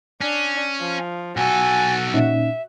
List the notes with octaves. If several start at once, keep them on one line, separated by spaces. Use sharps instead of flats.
C#4 D4
F3
B1 F#4 A4 G#5
A#2 C#4 D#4 E5